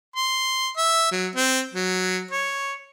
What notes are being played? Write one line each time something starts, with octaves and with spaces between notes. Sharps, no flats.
C6
E5
F#3
C4
F#3
C#5